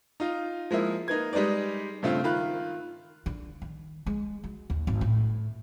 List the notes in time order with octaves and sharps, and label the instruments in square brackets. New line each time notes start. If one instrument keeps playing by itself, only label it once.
[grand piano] D#4 F4
F3 G#3 A#3 E4
A#3 D#4 B4 G#6
G3 G#3 D#4 B4 D5
G2 C#3 A3 C4 F4
D#3 F4 B5 F#6
[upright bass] D3
D#3
G#3
F#3
D#2
G#1
A2